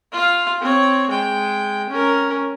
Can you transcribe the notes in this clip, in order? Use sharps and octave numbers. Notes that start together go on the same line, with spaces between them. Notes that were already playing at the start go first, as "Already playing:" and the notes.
F4 F5
C4 C#5
G#3 G5
C#4 A#4